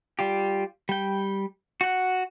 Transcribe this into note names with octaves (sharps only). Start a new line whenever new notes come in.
G3 F4 G4
G3 G5
F#4 F#5